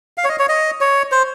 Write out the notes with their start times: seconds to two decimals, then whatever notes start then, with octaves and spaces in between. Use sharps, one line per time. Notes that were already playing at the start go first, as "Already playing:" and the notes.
0.18 F5
0.24 C#5
0.29 D#5
0.39 C#5
0.49 D#5
0.81 C#5
1.12 C5